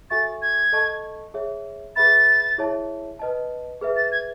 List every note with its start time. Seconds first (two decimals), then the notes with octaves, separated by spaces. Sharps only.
0.10 F#4 A4 E5 G#5 C#6 A6
0.42 G#6
0.72 A4 D#5 A5 C#6
1.34 G#4 C#5 E5
1.96 G#4 B4 E5 B5 A6
2.58 E4 G#4 C#5 E5 A5
3.19 B4 D#5 A5
3.81 G#4 B4 E5
3.96 A6
4.12 G#6